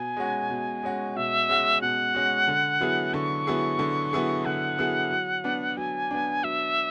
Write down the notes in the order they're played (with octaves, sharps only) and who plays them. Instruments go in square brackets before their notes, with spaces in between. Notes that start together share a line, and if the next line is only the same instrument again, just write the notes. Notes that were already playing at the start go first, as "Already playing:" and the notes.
Already playing: [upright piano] B2 [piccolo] G#5
[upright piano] G#3 C#4 F#4
B2
G#3 C#4 F#4
[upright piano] B2 [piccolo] E5
[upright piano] G#3 C#4 F#4
[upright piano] B2 [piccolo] F#5
[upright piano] G#3 C#4 F#4
D3
F#3 B3 E4 G#4
[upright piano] D3 [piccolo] C#6
[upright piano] F#3 B3 E4 G#4
D3
F#3 B3 E4 G#4
[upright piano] D3 [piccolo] F#5
[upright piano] F#3 B3 E4 G#4
F#3
B3 D4
[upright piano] F#3 [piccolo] G#5
[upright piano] B3 D4
[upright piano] F#3 [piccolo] E5